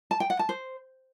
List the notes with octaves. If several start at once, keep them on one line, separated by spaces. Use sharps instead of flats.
A5
G5
F#5
A5
C5